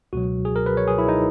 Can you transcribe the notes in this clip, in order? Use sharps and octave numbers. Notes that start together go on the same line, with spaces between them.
C#2 B2 F#3 F#4
G#4
A#4
B4
C#5
G#4
E4
D#4